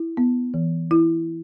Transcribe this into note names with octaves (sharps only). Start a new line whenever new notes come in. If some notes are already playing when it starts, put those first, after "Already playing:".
Already playing: E4
B3
E3
E4